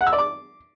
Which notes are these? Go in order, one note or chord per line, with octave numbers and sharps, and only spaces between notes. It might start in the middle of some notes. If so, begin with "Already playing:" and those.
F#5
E6
D5
D6